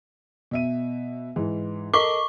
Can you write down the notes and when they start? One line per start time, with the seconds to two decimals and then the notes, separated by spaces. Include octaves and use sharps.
0.51 B2 E5 D#7
1.36 G#2 E3
1.94 A4 A#4 D#5 C#6 D6